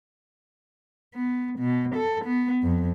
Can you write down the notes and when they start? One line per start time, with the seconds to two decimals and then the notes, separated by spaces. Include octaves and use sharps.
1.15 B3
1.60 B2
1.96 A4
2.25 B3
2.63 F2